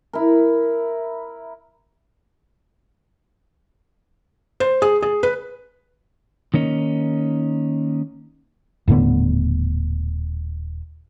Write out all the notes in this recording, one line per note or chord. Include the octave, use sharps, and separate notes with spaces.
E4 A#4
C5
G#4
G#4
B4
D#3 A#3 C#4 D#4
D#1 A2 D3 B3